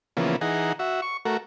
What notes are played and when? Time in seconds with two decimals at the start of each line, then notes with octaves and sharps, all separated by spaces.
0.17 C#3 E3 F3 A#3 B3
0.41 E3 D#4 G#4 F#5 A#5
0.79 F#4 E5
1.02 C#6
1.25 A3 F#4 A#4